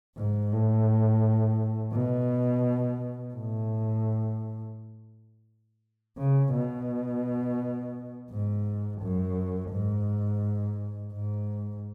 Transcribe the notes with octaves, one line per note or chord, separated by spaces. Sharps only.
G#2
A2
B2
A2
C#3
B2
G#2
F#2
G#2
G#2